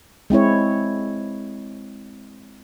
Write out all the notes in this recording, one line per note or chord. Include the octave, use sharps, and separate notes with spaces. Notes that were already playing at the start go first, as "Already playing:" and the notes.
G#3 C4 E4 C#5